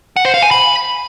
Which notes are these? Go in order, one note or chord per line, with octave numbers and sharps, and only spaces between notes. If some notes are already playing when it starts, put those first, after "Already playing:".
F#5
C5
F5
G#5
B5